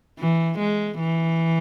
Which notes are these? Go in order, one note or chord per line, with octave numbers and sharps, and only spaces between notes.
E3
G#3
E3